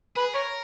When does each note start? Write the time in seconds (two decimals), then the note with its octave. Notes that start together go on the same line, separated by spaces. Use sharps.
0.16 G#4 B4
0.34 A#4 C#5